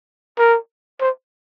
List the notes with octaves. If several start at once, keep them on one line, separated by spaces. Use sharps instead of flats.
A#4
C5